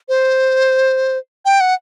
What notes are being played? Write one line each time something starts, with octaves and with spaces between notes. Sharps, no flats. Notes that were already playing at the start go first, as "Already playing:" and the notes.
C5
G5
F#5